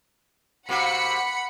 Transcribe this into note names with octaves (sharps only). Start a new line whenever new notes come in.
C3 A#3 F#4 F#5 B5 C#7